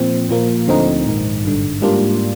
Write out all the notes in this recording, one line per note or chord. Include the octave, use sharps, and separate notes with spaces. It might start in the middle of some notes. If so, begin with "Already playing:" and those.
Already playing: A#2 F3 C4
A#2 F3 A#3
D2 D3 F3 C4 D#4
A#1 G#2 D#3
G#1 G2 D3
G#2 G3 A#3 D4 F4